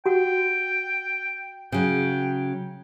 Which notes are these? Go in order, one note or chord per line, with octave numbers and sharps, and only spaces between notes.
F#4 F#5 G5
C#3 F#3 G5